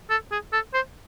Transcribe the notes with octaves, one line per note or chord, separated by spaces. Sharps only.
A4
G#4
A4
C5